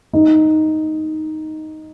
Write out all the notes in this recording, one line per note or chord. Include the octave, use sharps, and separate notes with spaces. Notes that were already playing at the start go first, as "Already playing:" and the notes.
D#4